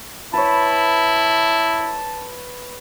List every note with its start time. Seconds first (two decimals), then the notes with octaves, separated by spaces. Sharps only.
0.34 E4 B4 C#5 A5